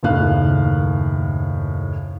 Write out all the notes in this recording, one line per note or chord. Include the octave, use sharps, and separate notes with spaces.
F#1 D#2 A2 F5 F#6